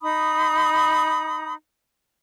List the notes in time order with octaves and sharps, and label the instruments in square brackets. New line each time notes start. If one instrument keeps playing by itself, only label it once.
[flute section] D#4 B5 D#6